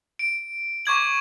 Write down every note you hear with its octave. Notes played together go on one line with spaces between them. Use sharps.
D7
C#6 D6 G#6 F#7